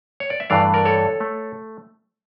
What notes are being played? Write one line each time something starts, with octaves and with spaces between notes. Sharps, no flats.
C#5
D5
E5
G2 E3 A3 D4 D5 F5
A#4 D5
A4 C#5
A3